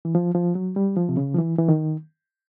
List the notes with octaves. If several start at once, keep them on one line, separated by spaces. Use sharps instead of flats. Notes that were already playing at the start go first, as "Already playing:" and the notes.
E3
F3
F3
F#3
G3
F3
C3
C#3
F3
E3
E3
D#3